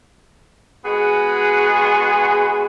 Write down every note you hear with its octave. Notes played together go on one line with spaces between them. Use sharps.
G#3 B3 F#4 G#4